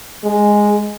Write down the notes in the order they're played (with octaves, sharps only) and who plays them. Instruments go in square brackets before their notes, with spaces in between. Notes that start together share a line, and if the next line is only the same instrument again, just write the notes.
[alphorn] G#3